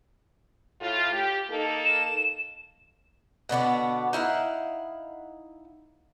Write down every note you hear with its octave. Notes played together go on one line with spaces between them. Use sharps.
A2 F4
G4
A#3 D#4 A4
E7
B2 D3 B3 D5
D#4 E4 F5 F#5